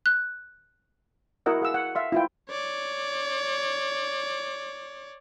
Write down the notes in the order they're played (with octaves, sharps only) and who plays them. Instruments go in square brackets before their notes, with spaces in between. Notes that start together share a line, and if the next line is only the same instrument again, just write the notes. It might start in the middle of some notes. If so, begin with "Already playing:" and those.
[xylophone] F#6
[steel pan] E4 F#4 A#4 D#5 F#5 E6
G#4 F5 F#5 E6
F#5
E5 F5 C6
E4 F4 G5
[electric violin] C#5 D5